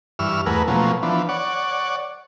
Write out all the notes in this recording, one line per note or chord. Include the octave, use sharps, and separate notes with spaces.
G2 E3 C#6 E6 F6
E2 A3 G#4 A#4 B4 F#5
B2 F3 F#3 A3 A#3 C#4
E3 F3 B3 D4
C#5 D5 F#5